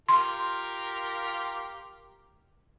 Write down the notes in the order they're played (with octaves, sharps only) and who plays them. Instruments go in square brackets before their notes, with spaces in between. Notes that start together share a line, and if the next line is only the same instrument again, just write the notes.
[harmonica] F4 G4 A#4 [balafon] C6